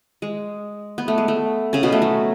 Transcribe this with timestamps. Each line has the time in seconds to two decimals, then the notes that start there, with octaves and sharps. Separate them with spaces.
0.22 G#3
0.98 B3
1.08 A3
1.18 G#3
1.28 A3
1.73 C#3 C#4
1.83 B2 B3
1.92 A3
2.02 F#3